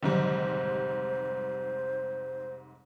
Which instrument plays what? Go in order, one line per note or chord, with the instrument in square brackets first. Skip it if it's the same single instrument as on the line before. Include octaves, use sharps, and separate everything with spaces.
[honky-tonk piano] F1 G#2 G3 [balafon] D3 D#3 F#3 [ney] C5